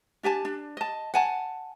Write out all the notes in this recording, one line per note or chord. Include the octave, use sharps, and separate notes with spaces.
D4 G4 G#5 A5
D4
D#5 A5
F#5 G#5 A5